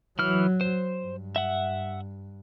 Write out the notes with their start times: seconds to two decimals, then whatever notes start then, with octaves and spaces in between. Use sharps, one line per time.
0.19 E3 F#3 F6
0.61 C5
1.03 G2
1.36 E5 F#5